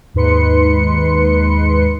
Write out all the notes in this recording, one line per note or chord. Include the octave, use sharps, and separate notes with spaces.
D#2 G#2 D#4 B4 C6 C#7